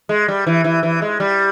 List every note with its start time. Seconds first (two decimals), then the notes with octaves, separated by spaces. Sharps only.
0.09 G#3
0.28 G3
0.46 E3
0.64 E3
0.83 E3
1.02 G#3
1.20 G3